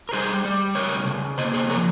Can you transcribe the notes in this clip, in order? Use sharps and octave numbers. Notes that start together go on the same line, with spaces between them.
A#4
G3 G#4 C5
G3
C#3 A#4 C#5
C#3
A#3 C5 D#5
G#4 C5
F3 A#4 C#5